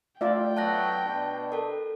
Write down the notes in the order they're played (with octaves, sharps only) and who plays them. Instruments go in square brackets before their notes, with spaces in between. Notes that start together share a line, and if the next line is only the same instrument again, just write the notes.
[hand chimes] A3 [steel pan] F4 D5 E5 [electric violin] G5
[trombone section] F#3 A3 B3 [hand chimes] A5 F#6 A#6
[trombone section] B2 D4
[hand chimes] A4 A#4